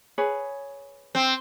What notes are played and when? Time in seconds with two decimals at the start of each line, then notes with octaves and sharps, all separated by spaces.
0.18 G#4 B4 C#5
1.15 C4